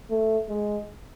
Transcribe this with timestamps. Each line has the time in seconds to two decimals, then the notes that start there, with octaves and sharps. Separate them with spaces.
0.10 A3
0.49 G#3